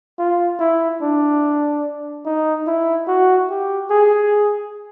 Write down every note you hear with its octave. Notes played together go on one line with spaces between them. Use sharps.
F4
E4
D4
D#4
E4
F#4
G4
G#4